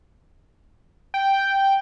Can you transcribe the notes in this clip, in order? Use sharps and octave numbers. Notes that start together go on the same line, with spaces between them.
G5